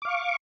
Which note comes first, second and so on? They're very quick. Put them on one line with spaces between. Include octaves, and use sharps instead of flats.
D6 F5 C#6